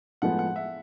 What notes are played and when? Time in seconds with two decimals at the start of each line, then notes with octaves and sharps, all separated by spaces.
0.22 A2 F3 G#3 B3 F#5
0.39 F#5
0.56 E5